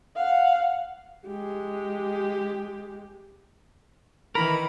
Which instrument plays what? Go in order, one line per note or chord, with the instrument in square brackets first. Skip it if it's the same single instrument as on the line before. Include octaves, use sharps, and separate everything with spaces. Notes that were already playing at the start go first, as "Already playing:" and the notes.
[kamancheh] F5 F#5
[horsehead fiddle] G#3 G4
[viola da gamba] D#3 E3 [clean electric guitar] A#4 [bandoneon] B5